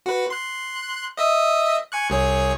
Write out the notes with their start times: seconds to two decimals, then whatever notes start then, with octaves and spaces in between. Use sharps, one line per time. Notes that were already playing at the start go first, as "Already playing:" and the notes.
0.06 F#4 B4
0.30 C6 F#6
1.17 D#5 E5 D#6
1.92 G#5 C#6 F#6
2.10 C2 G#4 C#5